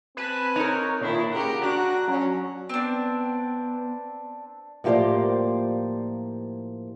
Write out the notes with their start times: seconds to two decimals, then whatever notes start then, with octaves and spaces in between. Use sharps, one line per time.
0.17 C4 B4 G#5 A5 F#6
0.56 D#4 A#4 C#5
1.01 A#2 D#3 D4 E4
1.32 C#3 G4 A#4 F#5
1.63 D4 F#4 A#5 F#6
2.08 F#3 C#4
2.69 B3 C4 D4
4.84 A2 F3 A#3 G4 C5 D5